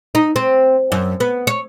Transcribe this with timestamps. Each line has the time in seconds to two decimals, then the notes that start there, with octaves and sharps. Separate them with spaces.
0.15 D#4
0.36 C4
0.92 F#2
1.20 B3
1.47 C#5